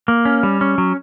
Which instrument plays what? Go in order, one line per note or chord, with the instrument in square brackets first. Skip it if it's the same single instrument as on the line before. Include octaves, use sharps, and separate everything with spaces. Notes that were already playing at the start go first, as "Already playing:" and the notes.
[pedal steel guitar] A#3
C#4
G3
C#4
F#3